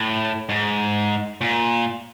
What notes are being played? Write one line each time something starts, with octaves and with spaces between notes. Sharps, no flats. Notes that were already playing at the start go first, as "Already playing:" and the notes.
Already playing: A2
G#2
A#2